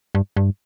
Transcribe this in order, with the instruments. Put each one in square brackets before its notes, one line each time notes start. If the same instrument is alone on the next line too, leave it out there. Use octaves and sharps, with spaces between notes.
[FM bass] G2
G2